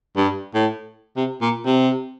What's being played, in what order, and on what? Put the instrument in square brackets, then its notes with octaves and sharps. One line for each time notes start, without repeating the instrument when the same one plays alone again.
[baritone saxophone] G2
A2
C3
A#2
C3